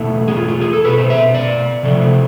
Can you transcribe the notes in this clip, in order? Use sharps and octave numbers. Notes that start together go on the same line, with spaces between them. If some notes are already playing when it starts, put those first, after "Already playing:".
Already playing: E2 B2 A3 E4
G#4
F4
F4
G#4
A4
B2 B3 B4
C5
E5
D5
C3 F3 A3